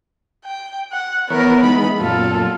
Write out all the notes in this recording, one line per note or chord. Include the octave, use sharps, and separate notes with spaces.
G5
F#5
E3 B3 A#4 B4 C#5
E3 G#3 D#4 B5
F#2 A#2 F4 A4